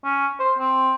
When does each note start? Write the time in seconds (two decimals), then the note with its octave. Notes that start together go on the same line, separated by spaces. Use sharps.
0.04 C#4
0.39 C5
0.58 C4